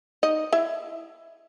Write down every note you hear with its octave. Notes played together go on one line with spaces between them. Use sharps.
D#4 D#5
E4 E5